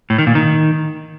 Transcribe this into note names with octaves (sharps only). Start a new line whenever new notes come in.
A2
D#3
A#2
D#3